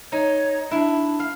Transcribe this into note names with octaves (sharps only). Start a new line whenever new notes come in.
D#4 C#5
D4 E4
F5